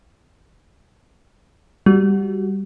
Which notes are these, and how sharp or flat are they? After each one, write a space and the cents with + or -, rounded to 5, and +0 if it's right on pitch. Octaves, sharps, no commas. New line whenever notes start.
G3 +0 F#4 +0